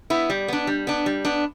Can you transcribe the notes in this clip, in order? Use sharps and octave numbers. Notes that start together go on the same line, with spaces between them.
B3 E4
G3
B3 D4
G3
B3 D4
G3
B3 D4